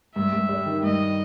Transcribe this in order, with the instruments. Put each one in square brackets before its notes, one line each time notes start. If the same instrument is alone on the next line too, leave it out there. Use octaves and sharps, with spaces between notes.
[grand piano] G2 [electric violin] E5
[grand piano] G2
G3
D#3
[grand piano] G2 [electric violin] D#5